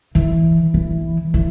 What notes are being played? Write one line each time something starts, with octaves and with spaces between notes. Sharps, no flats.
E3
E3
E3